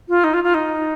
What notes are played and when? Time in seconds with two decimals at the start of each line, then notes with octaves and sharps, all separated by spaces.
0.08 F4
0.24 D#4
0.33 F4
0.43 F4
0.54 D#4